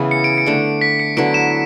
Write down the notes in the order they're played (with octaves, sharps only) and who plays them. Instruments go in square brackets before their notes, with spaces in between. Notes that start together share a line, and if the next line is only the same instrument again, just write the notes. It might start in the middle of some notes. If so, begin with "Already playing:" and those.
Already playing: [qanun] C#3 E3 B3 E4
[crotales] C#7
D7
C#7
[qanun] D3 A3 D4
[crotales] B6
C#7
[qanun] D3 F#3 B3 E4 [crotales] D7
[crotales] E7